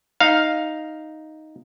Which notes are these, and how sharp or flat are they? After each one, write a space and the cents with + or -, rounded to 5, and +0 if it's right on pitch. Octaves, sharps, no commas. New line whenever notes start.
D#4 +0 F5 +0